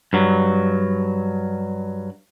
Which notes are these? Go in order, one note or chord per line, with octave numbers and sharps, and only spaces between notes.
G2 F#3